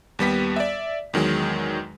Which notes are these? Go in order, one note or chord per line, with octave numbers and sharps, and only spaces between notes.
D#2 G3 B3 B6
D5 E5
E2 D#3 F#3 G#3